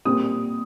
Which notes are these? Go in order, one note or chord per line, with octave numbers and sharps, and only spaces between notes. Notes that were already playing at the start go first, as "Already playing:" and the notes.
A#2 G3 C4 D#6